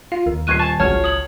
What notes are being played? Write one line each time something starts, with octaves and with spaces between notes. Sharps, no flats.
F4 F5
D#2 A#4
D#1 C#6 F#6 G#6 C7 D#7
G#5 A5 C#6
G#1 C#2 F#3 C#5 A5 F6
D#6 F#7